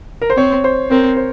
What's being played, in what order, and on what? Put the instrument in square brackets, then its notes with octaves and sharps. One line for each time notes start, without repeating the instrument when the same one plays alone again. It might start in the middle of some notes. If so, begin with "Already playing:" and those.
[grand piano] A#4
C5
[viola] C4 [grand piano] C#5
[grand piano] C5
[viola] C4 [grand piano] A#4
[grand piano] C5